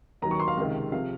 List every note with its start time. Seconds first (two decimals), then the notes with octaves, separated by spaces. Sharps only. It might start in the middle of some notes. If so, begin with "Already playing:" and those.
0.22 D#2 D#3 F#3 A#5
0.31 C#6
0.40 C6
0.48 F5
0.57 C#2 C3 D#3
0.92 C3 F3 F5